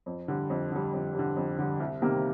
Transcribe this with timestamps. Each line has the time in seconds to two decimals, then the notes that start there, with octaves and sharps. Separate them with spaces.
0.06 F2
0.28 D3 G3
0.50 F2
0.72 D3 G3
0.93 F2
1.15 D3 G3
1.36 F2
1.58 D3 G3
1.80 C2
2.02 C3 D#3 G3 A#3